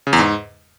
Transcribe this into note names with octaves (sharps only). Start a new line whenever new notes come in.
C#3
E2
G#2